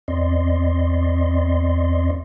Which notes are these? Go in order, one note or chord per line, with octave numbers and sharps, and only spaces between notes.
E2 C4 D5 D#5 C6